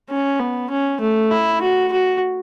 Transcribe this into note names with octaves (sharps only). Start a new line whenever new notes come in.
C#4
B3
C#4
A3
E4
F#4
F#4